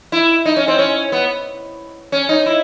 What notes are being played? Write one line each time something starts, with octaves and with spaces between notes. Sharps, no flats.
E4
D#4
C#4
C4
C#4
B3
C#4
D#4
E4